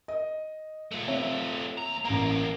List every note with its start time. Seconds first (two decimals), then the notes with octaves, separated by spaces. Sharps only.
0.08 D#5
0.92 A3 F4
1.08 C4 C#5 E5
1.78 D#2 A#5
2.05 A1 E2 A#3 A#5